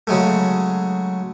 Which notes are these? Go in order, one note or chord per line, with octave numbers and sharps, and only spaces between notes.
C#3 F#3 G#3 A3